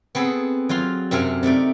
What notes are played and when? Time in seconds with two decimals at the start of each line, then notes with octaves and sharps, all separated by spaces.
0.15 B3 C4 G#4 A4
0.69 F#3 F4 F5 C6
1.11 F#2 C3 C4 A4 F5 G#5
1.43 C3 A3 D#4 D5